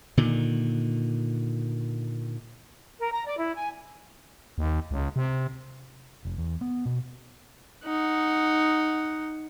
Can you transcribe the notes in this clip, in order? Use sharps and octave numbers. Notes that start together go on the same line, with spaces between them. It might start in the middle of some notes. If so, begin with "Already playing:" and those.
A#2 D3 D#3
A#4
A#5
D5
E4
G#5
D#2
C#2
C3
F1
E2
B3
B2
D#4 F#5